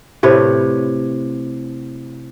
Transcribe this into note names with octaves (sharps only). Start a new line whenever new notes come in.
A2 C3 B4 C#5